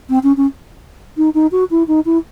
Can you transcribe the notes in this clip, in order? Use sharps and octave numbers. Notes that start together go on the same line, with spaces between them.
C4
C#4
C#4
D#4
D#4
F#4
E4
D#4
E4